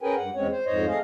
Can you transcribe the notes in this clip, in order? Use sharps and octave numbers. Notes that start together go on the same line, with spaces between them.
C#4 G#4 A#4 B4 G5 G#5
G2 F#5
E2 G#3 C4 C#4 C#5
C5
F2 G#2 C5 C#5 D#5
A3 G#4 D#5 F5